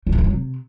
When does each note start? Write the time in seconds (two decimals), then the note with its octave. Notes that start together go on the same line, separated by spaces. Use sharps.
0.07 C#3
0.12 A2
0.18 D#3
0.24 F#3
0.30 C3